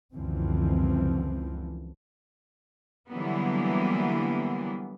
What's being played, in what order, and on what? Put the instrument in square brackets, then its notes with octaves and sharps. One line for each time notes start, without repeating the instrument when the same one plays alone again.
[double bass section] C#2 F#2 D3 E3 F3 C4
[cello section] D3 E3 F#3 G3 A#3 B3